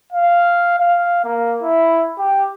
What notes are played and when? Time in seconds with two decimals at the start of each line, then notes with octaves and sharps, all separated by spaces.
0.12 F5
0.78 F5
1.25 A#3
1.63 E4
2.18 G4